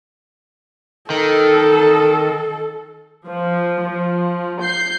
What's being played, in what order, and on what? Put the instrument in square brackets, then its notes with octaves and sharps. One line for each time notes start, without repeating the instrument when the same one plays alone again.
[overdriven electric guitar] D#3 [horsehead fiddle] A4
[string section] F3
F3
G6 C7